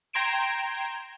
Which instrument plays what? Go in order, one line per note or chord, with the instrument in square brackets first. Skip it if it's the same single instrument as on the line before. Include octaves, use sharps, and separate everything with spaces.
[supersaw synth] G5 A#5 C6 G#6 D7 E7